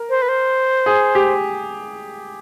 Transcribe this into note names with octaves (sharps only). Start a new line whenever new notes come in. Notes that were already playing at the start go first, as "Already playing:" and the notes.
Already playing: A#4
C5
B4
C5
G#4
G4